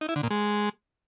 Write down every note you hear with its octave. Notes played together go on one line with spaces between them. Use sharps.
D#4
E4
D3
A#2
G#3